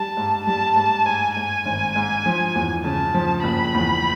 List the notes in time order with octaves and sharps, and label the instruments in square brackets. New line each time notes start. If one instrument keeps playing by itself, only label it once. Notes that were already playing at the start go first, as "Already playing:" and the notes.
Already playing: [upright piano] G3 [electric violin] A5
[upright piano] G#2
[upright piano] G3 [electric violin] A5
[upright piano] G#2 [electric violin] A5
[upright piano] G#2 [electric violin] G#5
[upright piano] G#2 [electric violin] G#5
[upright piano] G#1
G#2
F3
E2
[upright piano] C#3 [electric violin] A5
[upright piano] F3
[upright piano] F#1 [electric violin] B5
[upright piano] E2